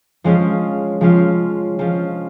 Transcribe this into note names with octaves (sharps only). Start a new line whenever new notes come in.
F3 G#3 C#4 F4
F3 G#3 C#4 F4
F3 G#3 C#4 F4